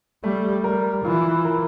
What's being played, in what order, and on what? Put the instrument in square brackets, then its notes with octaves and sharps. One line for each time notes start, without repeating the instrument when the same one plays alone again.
[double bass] G3 [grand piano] A3
[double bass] G3 [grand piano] A#4
[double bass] E3 [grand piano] F4
[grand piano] A#4